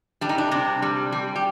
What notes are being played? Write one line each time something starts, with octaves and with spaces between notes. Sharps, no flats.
G3 D4
D#4
D4
C3 D4
G3
G3
G4